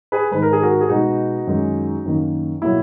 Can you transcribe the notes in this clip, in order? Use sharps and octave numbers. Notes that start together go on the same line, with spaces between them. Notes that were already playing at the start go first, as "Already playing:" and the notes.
G#4 B4
G#2 D#3 G#3 B4
A#4
G#4
F#4 A#4
G#4
B2 G#3 B3 D#4 F#4
F#2 D#3 G#3
F#2 D#3 A#3
B2 F#3 A#3 E4